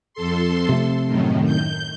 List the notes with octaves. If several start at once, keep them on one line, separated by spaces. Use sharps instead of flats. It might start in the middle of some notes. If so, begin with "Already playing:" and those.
F2 A4 C6
C3 A3
F#2 A2 D#3
G6